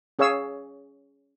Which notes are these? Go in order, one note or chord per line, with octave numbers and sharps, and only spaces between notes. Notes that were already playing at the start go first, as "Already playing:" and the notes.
C#4 G#4 C#5 F5 E6